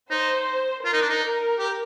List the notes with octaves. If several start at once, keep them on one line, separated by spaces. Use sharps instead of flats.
D#4 C5
F4 A#4
D#4
D4
D#4
A#4
G4